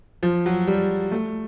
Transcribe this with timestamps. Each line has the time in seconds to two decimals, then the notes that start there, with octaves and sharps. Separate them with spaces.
0.23 F3
0.46 F#3
0.68 G3
1.12 A3